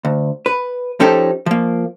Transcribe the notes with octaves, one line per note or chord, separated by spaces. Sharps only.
D2
B4
F3 C#4 D#4 G4 A4
F3 A#3